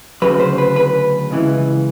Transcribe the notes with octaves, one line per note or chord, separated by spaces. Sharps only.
D2 C#3 F#3 B4
C5
B4
B4
C#2 C#3 E3